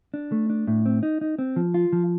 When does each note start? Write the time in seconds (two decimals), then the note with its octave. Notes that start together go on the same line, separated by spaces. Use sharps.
0.14 D4
0.32 A3
0.50 D4
0.67 A2
0.86 C4
1.03 D#4
1.21 D#4
1.38 C4
1.56 F3
1.74 F4
1.93 F3